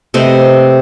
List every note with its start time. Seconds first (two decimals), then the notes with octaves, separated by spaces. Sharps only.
0.14 C3 A3 B4 D#5